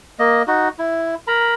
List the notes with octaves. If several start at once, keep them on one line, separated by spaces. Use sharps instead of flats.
A#3 D#5
D#4 F#4
E4
A#4 A#5 B5